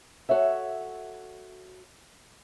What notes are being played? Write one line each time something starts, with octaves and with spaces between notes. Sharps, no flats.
F#4 A4 C#5 E5